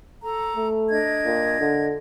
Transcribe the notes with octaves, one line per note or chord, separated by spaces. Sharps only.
A4 A#5
A3
D4 D#5 G#6
A#2
D3